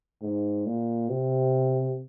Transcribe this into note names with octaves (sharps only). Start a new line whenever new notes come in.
G#2
A#2
C3